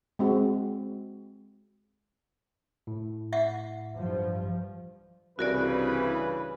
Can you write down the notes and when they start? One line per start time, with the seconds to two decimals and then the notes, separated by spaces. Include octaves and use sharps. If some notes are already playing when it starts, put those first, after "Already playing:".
0.19 G#3 C4 F#4
2.87 A2
3.33 E5 F#5
3.96 G2 F3
5.39 C2 G2 C#3 E3 F#4 A#4 B4 D5